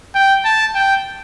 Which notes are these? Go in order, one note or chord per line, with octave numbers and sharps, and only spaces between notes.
G5
A5
G5